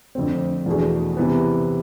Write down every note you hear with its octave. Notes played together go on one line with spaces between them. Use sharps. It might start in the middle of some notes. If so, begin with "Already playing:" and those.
F2 D3 A3 C4
E2 B2 A3 D4 G#4
C3 E3 B3